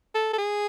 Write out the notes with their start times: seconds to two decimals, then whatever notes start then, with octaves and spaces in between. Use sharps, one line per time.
0.15 A4
0.33 A4
0.38 G#4